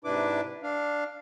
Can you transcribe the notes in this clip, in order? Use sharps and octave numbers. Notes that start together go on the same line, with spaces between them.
G#2 C3 D4 E4 B4 D6
D4 F5